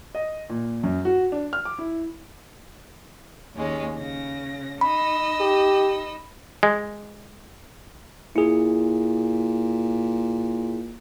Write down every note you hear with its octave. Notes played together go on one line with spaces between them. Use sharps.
D#5
A#2
F#2
F#4
D4
F6
D6
E4
D#2 G#3 C#4
C#3 A#6
D#4 D#5 B5 E6
G4
G#3
A#2 E4 G#4